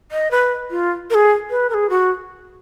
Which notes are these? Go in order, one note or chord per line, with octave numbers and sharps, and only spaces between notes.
D#5
B4
F4
A#4
G#4
B4
A#4
G#4
F#4